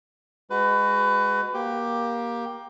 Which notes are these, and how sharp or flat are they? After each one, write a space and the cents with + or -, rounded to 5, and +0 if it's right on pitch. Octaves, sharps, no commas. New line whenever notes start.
G#3 -15 F#4 +0 B4 +25
A#3 +20 G4 +5